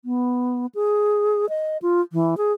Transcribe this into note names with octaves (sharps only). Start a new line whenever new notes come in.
B3
G#4
D#5
F4
E3
G#4